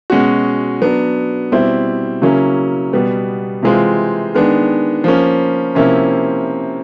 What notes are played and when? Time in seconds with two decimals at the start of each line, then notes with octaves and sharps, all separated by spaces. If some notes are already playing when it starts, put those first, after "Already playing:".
0.10 B2 G#3 C#4 F#4
0.81 F#3 B3 D4
1.52 B2 G3 C4 E4
2.22 C#3 F#3 A#3 C#4 E4
2.93 B2 G3 B3
3.63 C3 E3 G#3 C4 F4
4.34 D#3 G#3 B3 D4
5.04 F3 A#3 C#4
5.75 C3 F3 A#3 C#4 E4